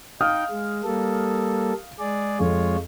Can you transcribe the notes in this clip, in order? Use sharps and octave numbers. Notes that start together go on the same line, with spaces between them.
D#4 F5 G5 D#6 F6
G#3
G3 A#3 A4
G#3 G#4 D5
F2 G#3 F4 C#5